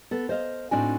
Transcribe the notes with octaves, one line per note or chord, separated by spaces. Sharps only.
B3 A4
C5 D#5 F5
A2 C4 D4 D#4 F#4 G#5